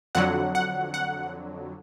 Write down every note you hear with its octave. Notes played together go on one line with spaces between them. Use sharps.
F2 D3 F#3 F#5
F#5
F#5